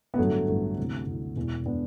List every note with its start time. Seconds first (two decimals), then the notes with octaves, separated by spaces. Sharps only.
0.14 B3
0.18 A1 G2 D3 F#3 A3
0.48 A1 G2 D3
0.77 D2 C3 E3
1.07 D2 C3 E3
1.36 E1 E2 B2
1.66 B2 B3 D4